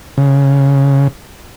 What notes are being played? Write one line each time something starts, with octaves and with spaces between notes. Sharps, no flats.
C#3